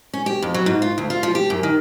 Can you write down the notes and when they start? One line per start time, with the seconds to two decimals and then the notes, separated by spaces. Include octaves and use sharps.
0.13 C#4
0.26 G4
0.42 F2
0.54 F#3
0.66 G#2
0.82 F4
0.98 D2
1.10 F4
1.23 F3
1.35 G4
1.50 F#2
1.63 D#3